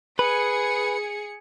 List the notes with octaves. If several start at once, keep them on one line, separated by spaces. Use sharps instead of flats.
G#4 B4 C#7